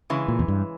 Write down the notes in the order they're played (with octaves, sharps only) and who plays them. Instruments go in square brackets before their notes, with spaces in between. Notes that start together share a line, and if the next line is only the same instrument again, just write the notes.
[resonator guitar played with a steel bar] C#3 E3 G#3
[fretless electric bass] A#2
E2
G2